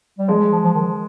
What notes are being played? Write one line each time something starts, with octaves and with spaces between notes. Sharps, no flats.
G3
F3 G#3
F3
F3
D#3